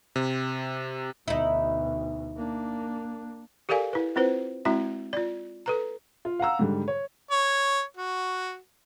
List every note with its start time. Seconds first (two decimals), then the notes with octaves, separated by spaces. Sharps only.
0.16 C3
1.28 D2 B2 D#4 E4
2.36 A#3 D4
3.69 G4 A4 A#4 D5 F5 G#5
3.93 E4 B4
4.16 C4 E4 F4 B4 C5
4.65 G#3 C4 E4 F#4 E5 A#5
5.13 F4 D5
5.66 A4 B4 A#5
6.25 F4
6.39 F5 F#5 A#5 E6
6.59 G#2 D3 G3
6.88 C#5
7.31 C#5
7.97 F#4